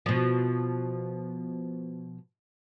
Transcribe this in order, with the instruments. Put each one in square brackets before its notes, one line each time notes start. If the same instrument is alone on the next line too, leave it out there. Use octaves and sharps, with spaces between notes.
[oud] B2 F3